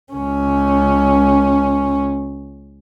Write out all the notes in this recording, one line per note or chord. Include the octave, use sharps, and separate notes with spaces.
C#2 C#4